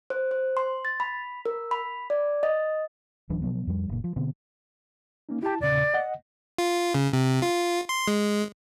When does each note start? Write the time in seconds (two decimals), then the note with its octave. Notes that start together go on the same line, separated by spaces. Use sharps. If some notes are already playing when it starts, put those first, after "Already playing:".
0.10 C5
0.31 C5
0.57 C6
0.85 A6
1.00 B5
1.46 A#4
1.71 B5
2.10 D5
2.43 D#5
3.30 D1 E3 F#3 D4
3.42 B2 F3 F#3 B3
3.67 F2 F3 G3
3.89 F#1 A#2
4.04 F3
4.16 B2 D3 B3 C4
5.29 A#3 C#4 D#4
5.42 E4 G4 A5
5.61 E2 A#2 C#3 D5
5.94 D#5 F#5
6.58 F4
6.94 C#3
7.13 C3
7.42 F4
7.89 C6
8.08 G#3